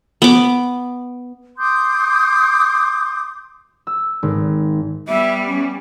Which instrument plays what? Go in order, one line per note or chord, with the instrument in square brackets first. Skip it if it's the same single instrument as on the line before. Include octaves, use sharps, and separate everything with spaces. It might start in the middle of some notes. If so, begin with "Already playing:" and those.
[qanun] B3 D6
[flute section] C6 D6 D#6 G6
[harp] E6
G#1
[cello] G3 B3 [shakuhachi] E5
[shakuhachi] C#4